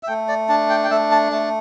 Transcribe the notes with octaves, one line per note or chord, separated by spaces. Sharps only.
E5
A3 G5
D5
D4 A5
G5
G5
A3 E5
A5
A3 A5